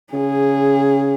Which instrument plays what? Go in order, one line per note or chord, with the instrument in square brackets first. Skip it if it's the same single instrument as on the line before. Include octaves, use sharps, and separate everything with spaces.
[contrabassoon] C#3 [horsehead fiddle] G#4